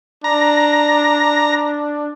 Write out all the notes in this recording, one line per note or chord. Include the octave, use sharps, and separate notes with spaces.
D4 A#5